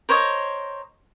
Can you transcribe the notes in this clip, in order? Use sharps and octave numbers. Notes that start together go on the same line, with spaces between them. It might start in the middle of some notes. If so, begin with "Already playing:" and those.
A#4 C5 C#5 D#5